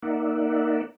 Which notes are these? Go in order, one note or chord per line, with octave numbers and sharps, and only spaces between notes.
A#3 D#4 A#4 D5 E5 F#5